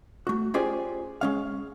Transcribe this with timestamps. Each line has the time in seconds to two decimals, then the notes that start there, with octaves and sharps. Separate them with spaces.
0.27 A3 F#4
0.54 C#4 F4 G4 G#4 C5 D5
1.21 G#3 C#4 F5